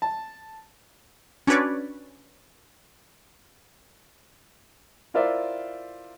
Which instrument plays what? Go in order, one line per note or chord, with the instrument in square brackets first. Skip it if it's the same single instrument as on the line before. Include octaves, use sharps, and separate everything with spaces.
[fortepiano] A5
[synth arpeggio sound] C#4 D4 F#4 B4 C#5 D5
[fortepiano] E4 F4 A#4 C5 D5 E5